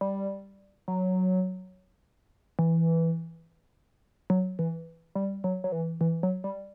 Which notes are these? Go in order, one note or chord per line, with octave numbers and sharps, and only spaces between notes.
G3
F#3
E3
F#3
E3
G3
F#3
F#3
E3
E3
F#3
G3